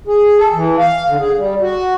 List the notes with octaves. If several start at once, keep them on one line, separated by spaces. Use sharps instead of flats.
G#4
A4
E3
F5
D3
G#4
G3
F#4